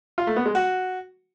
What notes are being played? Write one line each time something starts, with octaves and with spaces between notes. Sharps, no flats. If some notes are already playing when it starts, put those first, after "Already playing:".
F4
A3
B3
G#3
F#4